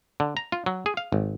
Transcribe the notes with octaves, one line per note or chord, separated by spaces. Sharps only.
D3
A#5
F4
F#3
G#4
F5
G#1